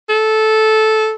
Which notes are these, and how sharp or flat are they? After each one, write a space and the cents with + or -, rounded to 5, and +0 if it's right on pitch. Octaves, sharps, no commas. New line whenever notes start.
A4 -10